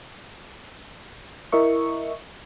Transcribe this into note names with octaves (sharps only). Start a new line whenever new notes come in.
E4 A#4 D#5 E5 C#6